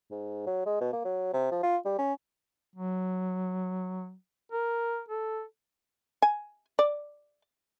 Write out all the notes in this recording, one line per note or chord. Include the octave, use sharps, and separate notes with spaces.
G#2
F#3
G#3
B2
A#3
F#3
C3
F3
F4
G3
C#4
F#3
A#4
A4
G#5
D5